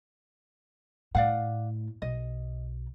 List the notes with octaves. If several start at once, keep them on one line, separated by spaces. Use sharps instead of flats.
A2 D5 F5 F#5
B1 D#5